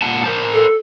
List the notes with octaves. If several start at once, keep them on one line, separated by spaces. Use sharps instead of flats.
A#2 F#5 A5
A#4 C5 A5
A4